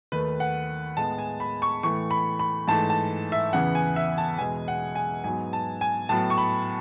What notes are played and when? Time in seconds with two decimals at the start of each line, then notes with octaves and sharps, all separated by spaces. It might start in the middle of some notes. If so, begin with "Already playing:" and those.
0.12 D#2 D#3 A3 B4
0.40 F#5
0.97 A2 G#3 B3 A5
1.18 G#5
1.40 B5
1.62 C#6
1.83 A2 E3 A3 C#6
2.11 B5
2.39 B5
2.68 G#2 E3 A3 A5
2.90 A5
3.32 E5
3.53 E2 C#3 E3 B3 F#5
3.75 G#5
3.96 E5
4.18 A5
4.38 E2 B2 G#3 G#5
4.68 F#5
4.95 G#5
5.24 G#2 F#3 B3 G#5
5.53 A5
5.81 G#5
6.09 A2 F#3 B3 A5
6.30 C#6
6.38 B5